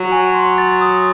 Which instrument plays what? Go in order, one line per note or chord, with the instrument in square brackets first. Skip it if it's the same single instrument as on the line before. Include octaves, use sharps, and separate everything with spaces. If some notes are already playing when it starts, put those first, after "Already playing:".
Already playing: [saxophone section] F#3
[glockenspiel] G#5
C6
A6
D#6